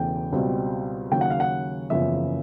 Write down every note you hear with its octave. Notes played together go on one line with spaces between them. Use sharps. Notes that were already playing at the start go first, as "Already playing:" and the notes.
Already playing: E1 E2 C#3 E3 A3 G5
C#2 B2 G3 C4
D#2 C#3 F#3 G5
F#5
F5
F#5
F#1 E2 C#3 F3 E5